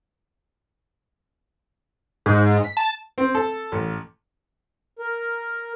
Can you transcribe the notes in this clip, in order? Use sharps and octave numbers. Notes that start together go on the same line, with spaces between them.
G#2
B6
A5
C4
A4
A1
A#4